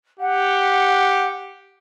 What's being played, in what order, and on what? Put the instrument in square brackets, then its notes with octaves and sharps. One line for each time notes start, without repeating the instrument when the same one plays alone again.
[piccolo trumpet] G4 [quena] F#5